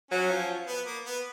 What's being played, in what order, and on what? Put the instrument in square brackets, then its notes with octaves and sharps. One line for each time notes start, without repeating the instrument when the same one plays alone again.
[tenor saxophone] F#3 [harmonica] C#4
[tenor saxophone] F3
[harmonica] B3
A#3
B3